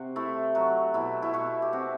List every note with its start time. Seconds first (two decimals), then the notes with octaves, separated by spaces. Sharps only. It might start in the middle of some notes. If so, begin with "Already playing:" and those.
Already playing: C3 F#4
0.16 A3 E4
0.55 F#3 F#4
0.94 B2 E4
1.22 E4
1.34 B2 F#4
1.62 G4
1.73 C4 F#4